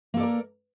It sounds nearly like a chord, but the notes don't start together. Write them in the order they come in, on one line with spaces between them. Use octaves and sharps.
A#3 A4 D5 A#4